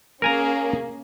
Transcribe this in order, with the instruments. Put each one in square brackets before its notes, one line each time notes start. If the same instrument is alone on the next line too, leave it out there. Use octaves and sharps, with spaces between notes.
[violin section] A#3 C#4 G#4 [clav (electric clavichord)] A#4 G#5 A#5